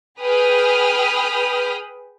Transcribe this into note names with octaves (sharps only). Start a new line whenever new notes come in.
G#4 B4 G5 B5 D#6 F6